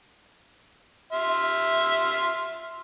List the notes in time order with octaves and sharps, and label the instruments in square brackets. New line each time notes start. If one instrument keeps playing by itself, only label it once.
[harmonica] E5 C6 F6